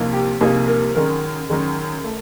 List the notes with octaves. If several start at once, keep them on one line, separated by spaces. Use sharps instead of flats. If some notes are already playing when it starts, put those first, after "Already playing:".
Already playing: C2 C3 F3 A#3 D#4
G4
C2 C3 F3 A#3 D#4 G#4
A#4
F#2 D#3 G#3 A#4
F#2 D#3 G#3
A3